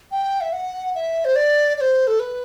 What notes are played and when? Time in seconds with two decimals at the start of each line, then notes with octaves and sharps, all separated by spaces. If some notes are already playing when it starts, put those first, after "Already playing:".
0.12 G5
0.41 E5
0.53 F#5
0.95 E5
1.25 C5
1.36 D5
1.77 D5
1.81 C5
2.07 A4
2.20 B4